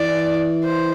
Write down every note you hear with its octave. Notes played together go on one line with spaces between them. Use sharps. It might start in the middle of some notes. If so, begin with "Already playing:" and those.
Already playing: E3 D5
C5